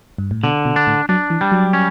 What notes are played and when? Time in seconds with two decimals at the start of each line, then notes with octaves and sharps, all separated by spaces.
0.18 G2
0.31 A2
0.43 B2 D3
0.65 B2
0.76 D4
0.87 A2
1.09 F#3 D4
1.30 E3
1.41 G3
1.52 F#3
1.73 C#4